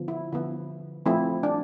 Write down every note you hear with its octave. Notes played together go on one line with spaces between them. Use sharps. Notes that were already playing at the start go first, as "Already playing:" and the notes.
Already playing: D3 F3 B3
E4
D3 F3 B3 E4
F3 A3 C4 E4
D4